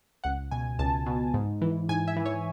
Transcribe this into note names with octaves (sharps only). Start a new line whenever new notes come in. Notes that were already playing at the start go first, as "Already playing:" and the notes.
C#2 F#5
B2 G#5
C#2 A5
B2
G#2
E3
G#2 G#5
E5
E3
C#5